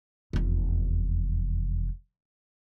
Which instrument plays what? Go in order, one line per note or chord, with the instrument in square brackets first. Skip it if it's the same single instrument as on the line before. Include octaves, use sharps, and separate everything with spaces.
[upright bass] F1 E2